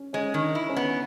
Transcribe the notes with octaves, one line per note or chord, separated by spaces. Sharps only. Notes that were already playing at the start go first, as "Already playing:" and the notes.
Already playing: C#4
G#3 C#4
D#3
D4
E4
C#4
B3